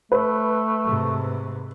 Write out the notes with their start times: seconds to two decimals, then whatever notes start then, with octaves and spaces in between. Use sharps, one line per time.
0.12 A3 B4
0.85 G#2 C3